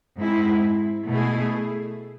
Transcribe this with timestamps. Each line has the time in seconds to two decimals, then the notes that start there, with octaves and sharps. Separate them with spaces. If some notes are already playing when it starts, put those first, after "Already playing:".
0.19 G#2 G#3 C4 E4
1.08 B2 A3 E4 G#4